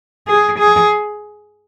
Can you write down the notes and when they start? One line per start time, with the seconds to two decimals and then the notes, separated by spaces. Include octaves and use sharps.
0.27 G#4
0.59 G#4